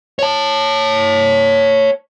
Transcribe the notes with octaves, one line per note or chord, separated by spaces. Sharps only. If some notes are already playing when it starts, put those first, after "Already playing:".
C#5 A5